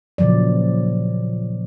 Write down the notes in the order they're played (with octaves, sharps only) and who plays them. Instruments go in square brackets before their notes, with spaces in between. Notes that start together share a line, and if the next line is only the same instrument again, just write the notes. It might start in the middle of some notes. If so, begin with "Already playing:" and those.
[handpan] A#2 C#3 F3 F#3 D5